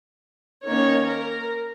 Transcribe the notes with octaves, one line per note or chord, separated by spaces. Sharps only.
D#3 A#3 C#4 C#5
A#4